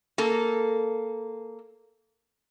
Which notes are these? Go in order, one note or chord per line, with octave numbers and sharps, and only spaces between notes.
A#3 A4